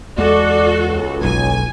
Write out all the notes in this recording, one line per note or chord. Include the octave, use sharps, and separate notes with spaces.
E2 G#3 F#4 A4 D5
C#2
F#1 B1 G#5